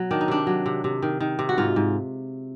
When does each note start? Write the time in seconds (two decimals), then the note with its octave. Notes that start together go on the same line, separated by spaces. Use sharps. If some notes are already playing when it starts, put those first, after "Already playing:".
Already playing: B2 F#3
0.11 D#3 D4
0.21 D#4
0.28 C3 D4
0.47 F#3
0.66 C3
0.84 C3
1.02 D#3
1.20 D#3
1.39 C3
1.49 F#4
1.58 G#2 F4
1.76 G#2